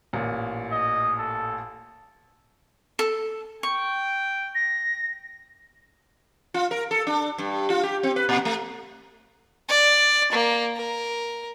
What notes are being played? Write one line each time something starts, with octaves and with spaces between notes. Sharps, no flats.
A1 A#2
D#5
A4
A4
G5 C#6
A#6
F4
A#4
A4
D4
G2
F4
G4
C4
B4
A#2
A3
D5
A#3
A#4